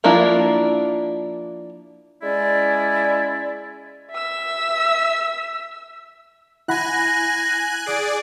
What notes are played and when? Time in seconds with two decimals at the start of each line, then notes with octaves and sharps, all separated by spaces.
0.04 F3 A#3 D4 E4 F4
2.22 G#3 C#4 E4 D5
4.11 E5 E6
6.68 E4 F#5 G#5 B5 F#6 A#6
7.86 G#4 D5 D7